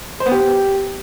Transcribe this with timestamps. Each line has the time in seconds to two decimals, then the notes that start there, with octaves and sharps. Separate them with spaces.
0.20 C5
0.26 B3
0.32 G4